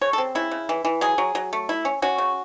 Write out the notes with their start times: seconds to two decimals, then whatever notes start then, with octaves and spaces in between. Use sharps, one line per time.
0.01 C#3 C#5
0.13 A4
0.18 C4
0.35 C#3 E4
0.51 C#3
0.69 E3
0.85 E3
1.01 F#3 G#4
1.18 F#3
1.35 F#3
1.53 A3
1.69 E4
1.85 C#4
2.02 C#4 F#4
2.18 C#3